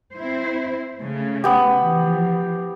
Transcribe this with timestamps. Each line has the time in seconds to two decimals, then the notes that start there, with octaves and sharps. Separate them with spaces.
0.14 C4 E4 C5
1.00 C#3 A3
1.44 B3 G4
1.79 E3 F3